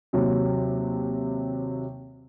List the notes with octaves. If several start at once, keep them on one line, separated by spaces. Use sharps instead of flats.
D#2 C3 F#3